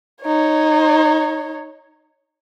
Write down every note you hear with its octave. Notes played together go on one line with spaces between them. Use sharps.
D#4 C#5